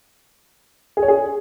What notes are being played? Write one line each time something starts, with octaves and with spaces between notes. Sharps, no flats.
G#4
C#5
G#4